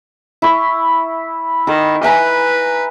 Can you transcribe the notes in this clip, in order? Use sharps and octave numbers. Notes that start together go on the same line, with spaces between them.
E4 C#6
D#3 A#4
B4 E5 G#5 A#5